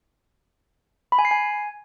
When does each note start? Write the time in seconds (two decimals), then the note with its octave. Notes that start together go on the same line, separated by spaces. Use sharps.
1.12 B5
1.19 G#5
1.25 C7
1.31 G#5